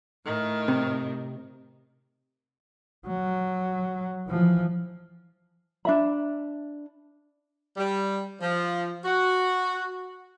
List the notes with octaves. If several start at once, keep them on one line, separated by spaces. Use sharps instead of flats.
A2 D#3
C3
F#3
E3 F3
D4 E5 B5
G3
F3
F#4